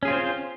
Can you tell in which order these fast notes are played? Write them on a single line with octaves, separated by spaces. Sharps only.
C#4 G#4 F4 C4 C5